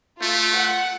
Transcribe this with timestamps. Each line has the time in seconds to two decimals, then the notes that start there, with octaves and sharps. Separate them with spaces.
0.22 A3 F4
0.56 F#5